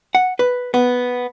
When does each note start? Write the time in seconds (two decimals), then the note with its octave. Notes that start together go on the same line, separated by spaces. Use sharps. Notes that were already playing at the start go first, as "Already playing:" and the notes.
0.15 F#5
0.39 B4
0.74 B3